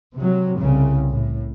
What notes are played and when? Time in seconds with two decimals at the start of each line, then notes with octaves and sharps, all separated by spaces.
0.16 C3 F#3
0.58 C2 C#3
1.09 A2